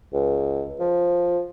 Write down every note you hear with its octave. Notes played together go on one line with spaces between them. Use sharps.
C#2
F3